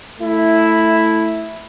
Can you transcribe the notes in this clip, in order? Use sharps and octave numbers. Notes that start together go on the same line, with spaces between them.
A3 E4